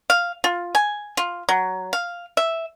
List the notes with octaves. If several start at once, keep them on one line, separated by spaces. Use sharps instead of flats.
F5
F4
G#5
F4
F#3
F5
E5